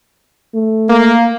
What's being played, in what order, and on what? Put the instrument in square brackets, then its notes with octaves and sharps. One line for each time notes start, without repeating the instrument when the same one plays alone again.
[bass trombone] A3
[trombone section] A#3